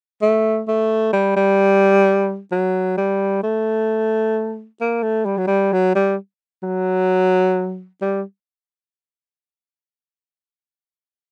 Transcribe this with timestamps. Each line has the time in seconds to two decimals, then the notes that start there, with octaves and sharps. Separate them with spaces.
0.22 A3
0.68 A3
1.13 G3
1.36 G3
2.52 F#3
2.98 G3
3.43 A3
4.81 A#3
5.03 A3
5.26 G3
5.38 F#3
5.48 G3
5.73 F#3
5.96 G3
6.63 F#3
8.02 G3